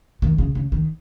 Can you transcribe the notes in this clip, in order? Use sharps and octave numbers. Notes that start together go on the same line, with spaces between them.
D#3
C#3
C#3
D#3